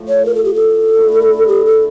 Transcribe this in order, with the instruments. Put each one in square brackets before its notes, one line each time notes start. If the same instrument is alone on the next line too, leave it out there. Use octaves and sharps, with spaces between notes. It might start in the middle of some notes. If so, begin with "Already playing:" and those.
Already playing: [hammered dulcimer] A2 F3 A3
[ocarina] C#5
A#4
A4
G4
A4
[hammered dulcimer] D3 A3 E4
[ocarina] G4
A4